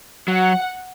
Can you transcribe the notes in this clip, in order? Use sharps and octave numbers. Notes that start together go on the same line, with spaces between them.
F#3 F#5